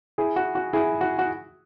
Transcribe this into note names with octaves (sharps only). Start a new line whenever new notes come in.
E4 G#4
F#4
F#4
E4 G#4
F#4
F#4